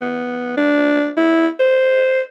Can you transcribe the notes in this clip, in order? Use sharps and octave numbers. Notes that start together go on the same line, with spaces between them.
B3
D4
E4
C5